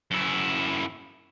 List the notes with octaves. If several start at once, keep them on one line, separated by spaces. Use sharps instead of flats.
F#2 E4